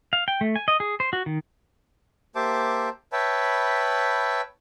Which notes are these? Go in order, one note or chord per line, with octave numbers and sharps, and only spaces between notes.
F5
G5
A3
G#5
D#5
G#4
C5
F#4
D#3
A#3 G4 C5 E5 A5 D6
B4 C#5 E5 G5 A5 B5